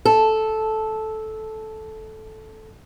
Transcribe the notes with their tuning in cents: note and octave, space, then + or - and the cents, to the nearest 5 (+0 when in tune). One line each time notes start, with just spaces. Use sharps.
A4 -10